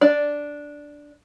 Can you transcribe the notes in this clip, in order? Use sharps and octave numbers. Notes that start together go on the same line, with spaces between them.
D4 D5